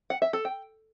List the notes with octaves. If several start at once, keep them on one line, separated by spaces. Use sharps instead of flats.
F#5
E5
A4
G5